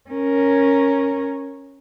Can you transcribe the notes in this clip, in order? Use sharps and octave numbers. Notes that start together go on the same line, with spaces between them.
C#4 A#4